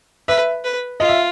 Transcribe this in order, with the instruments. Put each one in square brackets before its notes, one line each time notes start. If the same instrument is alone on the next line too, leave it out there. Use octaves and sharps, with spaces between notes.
[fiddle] B4 [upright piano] E5
[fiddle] B4
[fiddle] F4 [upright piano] D#5
[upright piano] E5